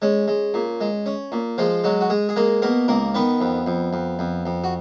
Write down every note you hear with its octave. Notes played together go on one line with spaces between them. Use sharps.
G#3 C#4
G#3
A#2
G#3
C#4
A#2
F3 G#3 F4
F#3 G#3 F#4
F#4
G#3 G#4
G#4
G#3 A#3 A#4
B2 A#3 A#4
C#2 A#3 A#4
D#3 B3 B4
F2
F2
F2
F2
F2
F#4